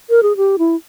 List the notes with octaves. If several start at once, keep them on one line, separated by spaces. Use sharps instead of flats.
A#4
G#4
G4
E4